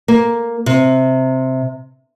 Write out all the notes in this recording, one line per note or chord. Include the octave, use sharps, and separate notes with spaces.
A#3
C3